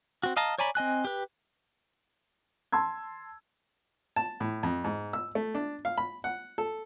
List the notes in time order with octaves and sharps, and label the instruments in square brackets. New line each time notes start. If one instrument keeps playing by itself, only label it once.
[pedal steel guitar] C4 F#4
D#5 F5 A5 A#5
C#5 D5 G#5 A#5 B5
C4 D#5 G#5 F#6
G4 B4
[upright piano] A5 C6 E6 G#6
[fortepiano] A5
A2
F2
G#2
E6
A3
D4
F5
B5
F#5
A4